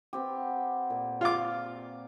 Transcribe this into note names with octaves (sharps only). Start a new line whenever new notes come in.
B3 C4 G4
A#2
F4 D6